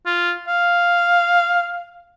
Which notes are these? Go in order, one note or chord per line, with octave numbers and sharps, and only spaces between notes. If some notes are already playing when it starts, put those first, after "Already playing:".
F4
F5